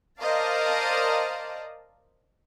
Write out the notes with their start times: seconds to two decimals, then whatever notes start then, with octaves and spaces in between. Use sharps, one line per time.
0.19 A#4 C5 D5 D#5 F5 A5